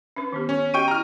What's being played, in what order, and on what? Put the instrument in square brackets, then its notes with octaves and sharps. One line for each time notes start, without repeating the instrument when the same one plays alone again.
[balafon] C#4 D4 B4
D#3 B3 G4
[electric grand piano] C#4
[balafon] F#4 G4 D#5 [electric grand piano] G5 C#6 D#7
[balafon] E4 G4 [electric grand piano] A#5 F6